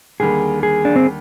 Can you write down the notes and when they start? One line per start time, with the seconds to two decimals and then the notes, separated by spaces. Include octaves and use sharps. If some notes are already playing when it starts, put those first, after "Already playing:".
0.20 D#2 D3 G3 A#3 G#4
0.63 G#4
0.85 D4
0.96 C4